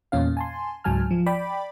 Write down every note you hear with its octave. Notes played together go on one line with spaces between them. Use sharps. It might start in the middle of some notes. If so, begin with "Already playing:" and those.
E2 A#2 C#4 F5
G#5 A5 C6
C#2 G#2 F#3 G#5 A5 F6
F3
D5 G5 B5 D6